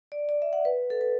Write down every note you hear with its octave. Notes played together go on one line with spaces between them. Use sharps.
D5
D5
E5
F#5
B4
A4
B4